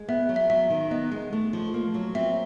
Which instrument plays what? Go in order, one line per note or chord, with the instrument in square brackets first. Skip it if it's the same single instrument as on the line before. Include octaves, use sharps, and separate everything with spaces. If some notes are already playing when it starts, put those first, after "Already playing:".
Already playing: [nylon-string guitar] G#3
[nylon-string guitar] B3 [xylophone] E5
[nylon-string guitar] F#3
[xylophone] E5
[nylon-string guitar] F#3 [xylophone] E5
[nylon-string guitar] D#3
[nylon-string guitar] B3 [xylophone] D#5
[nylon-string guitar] G#3
A3
F3
A#3
F#3
[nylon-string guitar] C4 [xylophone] E5